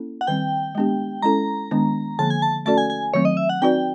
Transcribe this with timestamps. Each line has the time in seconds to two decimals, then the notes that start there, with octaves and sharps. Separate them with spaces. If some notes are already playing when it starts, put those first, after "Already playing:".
Already playing: A#3 C#4 E4 A4
0.21 F#5
0.27 D#3 G3 C4 G5
0.75 G#3 B3 D4 G4
1.23 G#3 C#4 E4 A4 A#5
1.71 D#3 G#3 B3 D4
2.19 D3 F3 A#3 A5
2.30 G#5
2.42 A5
2.66 A3 C#4 F#4 A4 D5 A5
2.78 G#5
2.90 G#5
3.14 D#3 F#3 A3 C4 C#5
3.25 D#5
3.37 E5
3.49 F#5
3.62 C4 D#4 F#4 B4 D5 G5